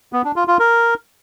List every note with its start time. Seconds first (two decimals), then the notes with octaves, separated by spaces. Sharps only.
0.13 B3
0.24 D4
0.36 F4
0.48 F4
0.59 A#4